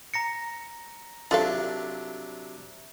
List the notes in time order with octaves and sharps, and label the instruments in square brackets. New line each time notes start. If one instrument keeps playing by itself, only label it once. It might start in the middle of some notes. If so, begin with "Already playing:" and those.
[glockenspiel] A#5 A#6 C#7
[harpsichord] C3 F#3 D4 [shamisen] F4 A4 F5